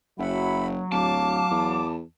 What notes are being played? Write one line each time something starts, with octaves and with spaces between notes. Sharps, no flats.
F#1 F#3 E5 F#5 B5
D1 F5 A5 D6
E2